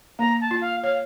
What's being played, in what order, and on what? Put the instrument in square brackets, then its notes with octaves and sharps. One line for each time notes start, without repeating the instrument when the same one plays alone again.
[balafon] A#3 [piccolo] A#5
[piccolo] A5
[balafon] F4
[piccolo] F5
[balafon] C#5 [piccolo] F5